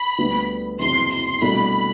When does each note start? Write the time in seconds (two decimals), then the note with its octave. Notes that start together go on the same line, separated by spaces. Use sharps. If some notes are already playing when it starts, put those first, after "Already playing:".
Already playing: B5
0.18 D2 D3 G3 B3
0.79 F#1 E2 C3 F#3 C6
1.11 C6
1.41 C2 B2 A3 D4 G4 B5